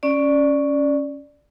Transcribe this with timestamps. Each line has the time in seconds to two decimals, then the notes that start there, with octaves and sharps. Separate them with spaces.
0.03 C#4 D5